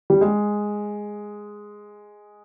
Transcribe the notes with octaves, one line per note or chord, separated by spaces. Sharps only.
G3
G#3